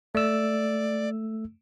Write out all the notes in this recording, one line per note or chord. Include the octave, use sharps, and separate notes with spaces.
A3 D5 E6